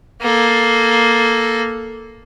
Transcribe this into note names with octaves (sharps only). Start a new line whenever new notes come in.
A#3 A4